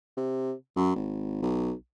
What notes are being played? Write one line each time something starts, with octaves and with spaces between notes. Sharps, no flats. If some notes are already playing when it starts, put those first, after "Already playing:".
C3
F#2
G#1
B1